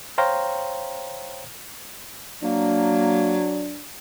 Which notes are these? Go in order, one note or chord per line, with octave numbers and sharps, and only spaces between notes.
C5 C#5 F5 G5 A#5 C6
F#3 A#3 D4